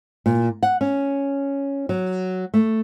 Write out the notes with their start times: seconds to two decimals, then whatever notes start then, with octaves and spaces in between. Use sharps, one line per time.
0.26 A#2
0.63 F#5
0.81 C#4
1.89 F#3
2.54 A3